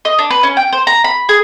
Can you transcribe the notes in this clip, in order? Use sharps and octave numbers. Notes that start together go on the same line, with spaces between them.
D#5
D4
B4
C#4
G5
C5
A#5
B5
G#4